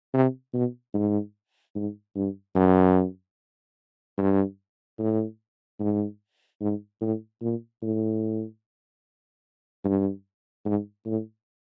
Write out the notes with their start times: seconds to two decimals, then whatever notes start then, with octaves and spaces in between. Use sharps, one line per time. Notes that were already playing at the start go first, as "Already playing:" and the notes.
0.14 C3
0.54 B2
0.94 G#2
1.75 G#2
2.15 G2
2.56 F#2
4.18 G2
4.99 A2
5.80 G#2
6.61 G#2
7.01 A2
7.41 A#2
7.82 A2
9.85 G2
10.65 G#2
11.06 A2